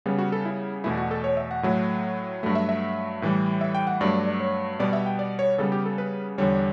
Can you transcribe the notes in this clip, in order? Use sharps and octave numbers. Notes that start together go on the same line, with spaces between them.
C#3 G3 B3
F#4
A4
E4
E2 B2 A3 E4
F#4
A4
C#5
E5
F#5
A2 F#3 A3
G2 F#3 A3
E5
E5
A2 E3 G3
E5
G5
F#5
G2 F#3 A3 D5
D5
D5
C#5
B2 G3 B3 D5
E5
G5
D5
C#5
C#3 G3 B3 A4
G4
A4
B4
E2 D3 G3 C#5